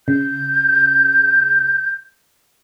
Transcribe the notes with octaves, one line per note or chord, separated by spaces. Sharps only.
C#3 G6